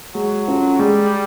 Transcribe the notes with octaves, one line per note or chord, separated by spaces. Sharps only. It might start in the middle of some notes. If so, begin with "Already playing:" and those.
F#3 G#3
C#4 F4 A4
G3 G#3